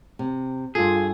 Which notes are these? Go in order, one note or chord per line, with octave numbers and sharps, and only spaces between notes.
C3
G2 F4 G#4 A4